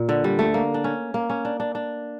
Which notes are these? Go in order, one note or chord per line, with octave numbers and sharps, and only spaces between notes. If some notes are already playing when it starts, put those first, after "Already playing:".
Already playing: A#2
D3
G3
A3
A#3
D4
C#4
A#3
C#4
D4
D4
D4